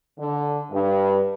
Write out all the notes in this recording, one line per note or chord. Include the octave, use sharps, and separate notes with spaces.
D3
G2